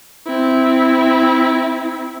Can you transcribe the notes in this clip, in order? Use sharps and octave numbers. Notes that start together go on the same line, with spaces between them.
C4 E4